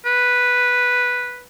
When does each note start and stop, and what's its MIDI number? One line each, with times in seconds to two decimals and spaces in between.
0.06 1.44 71